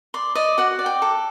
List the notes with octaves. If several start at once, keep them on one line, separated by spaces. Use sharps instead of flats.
D5 C6
D5 D#5
F#4 F#5
D5
G5
A4